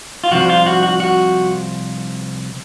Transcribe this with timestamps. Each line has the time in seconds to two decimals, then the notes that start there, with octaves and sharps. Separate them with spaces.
0.24 F4
0.32 C2 C3 F3 F#4
0.49 F4
0.66 F#4
0.83 F#4
1.00 F#4